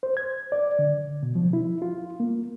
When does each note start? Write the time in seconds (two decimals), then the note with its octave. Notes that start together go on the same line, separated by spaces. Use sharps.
0.03 C5
0.17 G#6
0.52 D5
0.79 D3
1.23 B2
1.35 F3
1.53 E4
1.82 F4
2.20 A#3